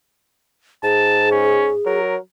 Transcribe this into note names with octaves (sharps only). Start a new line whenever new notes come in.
G#2 G#4 A5
C#4
F#3 A#4